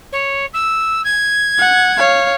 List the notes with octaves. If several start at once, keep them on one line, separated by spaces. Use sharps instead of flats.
C#5
E6
G#6
F#5
C#5 F5